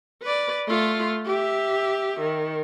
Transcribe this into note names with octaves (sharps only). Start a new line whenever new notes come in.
B4 D5
A3 F4
G4 E5
D#3